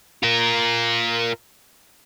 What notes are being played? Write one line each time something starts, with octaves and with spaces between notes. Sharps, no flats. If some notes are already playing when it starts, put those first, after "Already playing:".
F4 A#4